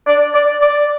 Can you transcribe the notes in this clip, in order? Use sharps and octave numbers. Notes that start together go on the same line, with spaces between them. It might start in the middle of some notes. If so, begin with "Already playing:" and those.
D5
D5
D5